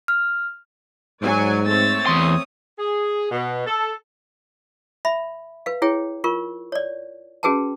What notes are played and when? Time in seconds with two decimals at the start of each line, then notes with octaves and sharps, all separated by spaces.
0.08 F6
1.21 G#2 F#3 D5 G#5
1.66 A3 C4 C#5 E6 A6
2.07 E2 C6 D#6
2.79 G#4
3.31 B2
3.66 A4
5.05 E5 B5
5.66 B4 F5
5.82 E4 G#4 C#5 G5
6.24 F4 A#4 C#6
6.72 C#5 D5
7.43 C#4 F#4 G#4 B4 G5 A5